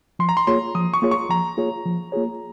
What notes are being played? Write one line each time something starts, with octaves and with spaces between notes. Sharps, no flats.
F3 C6
A#5
C6
A#3 F4 G#4 C#5 C6
F3 D#6
C#6
A#3 F4 G#4 C#5
C#6
F3 A#5
A#3 F4 G#4 C#5
F3
A#3 F4 G#4 C#5